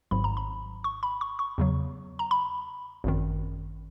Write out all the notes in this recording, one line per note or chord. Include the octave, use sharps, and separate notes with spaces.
G#1 G#2 F#3 B5
A#5
B5
C#6
B5
C#6
C#6
E2 C#3 F#3
A#5
B5
G#1 F#2 D#3